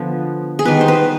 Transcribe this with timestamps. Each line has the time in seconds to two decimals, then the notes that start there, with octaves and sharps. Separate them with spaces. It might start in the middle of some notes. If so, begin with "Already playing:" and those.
Already playing: D3 F3 B3
0.59 G#4
0.65 D#3 G3 B3 B4
0.81 C5
0.88 B4